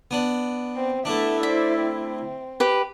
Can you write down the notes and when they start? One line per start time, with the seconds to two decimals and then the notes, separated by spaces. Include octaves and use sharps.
0.11 B3 D4
0.77 C4
1.05 A3 B3 D4 E4 E5
1.43 C5 D5 E5
1.81 C4
2.60 G4 B4